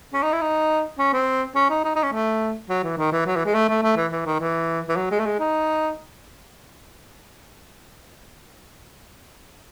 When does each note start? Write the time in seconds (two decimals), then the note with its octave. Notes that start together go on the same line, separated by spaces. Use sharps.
0.13 C#4
0.22 D#4
0.32 E4
0.41 D#4
0.99 C#4
1.13 C4
1.55 C#4
1.70 D#4
1.84 D#4
1.95 D#4
2.03 C#4
2.12 A3
2.69 F#3
2.83 E3
2.98 D#3
3.12 E3
3.26 F#3
3.36 E3
3.45 G#3
3.54 A3
3.69 A3
3.83 A3
3.97 E3
4.12 E3
4.26 D#3
4.40 E3
4.88 E3
4.96 F#3
5.11 G#3
5.19 A3
5.26 G#3
5.40 D#4